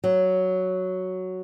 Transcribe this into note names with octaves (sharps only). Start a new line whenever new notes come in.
F#3